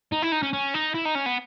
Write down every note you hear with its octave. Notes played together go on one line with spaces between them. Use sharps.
D#4
E4
D#4
C#4
C#4
D#4
E4
D#4
C#4
B3